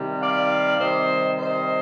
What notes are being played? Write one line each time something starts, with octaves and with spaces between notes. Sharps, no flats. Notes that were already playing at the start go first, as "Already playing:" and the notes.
Already playing: C3 D#3 G3
D5 F5
C3 D#3 G3 C5 D#5
C5 D#5